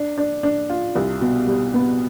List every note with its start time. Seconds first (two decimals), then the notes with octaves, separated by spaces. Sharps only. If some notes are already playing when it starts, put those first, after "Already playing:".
Already playing: D4
0.18 D4
0.43 D4
0.70 F4
0.95 C2
1.21 B2
1.47 G3
1.74 B3